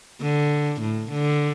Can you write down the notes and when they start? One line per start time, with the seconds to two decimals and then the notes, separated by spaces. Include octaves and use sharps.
0.22 D3
0.81 A2
1.11 D3